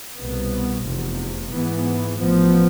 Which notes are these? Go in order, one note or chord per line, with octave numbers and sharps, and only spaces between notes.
C2 B2 B3
F1 E2 C3
G#2 E3 B3
A1 A2 F3 B3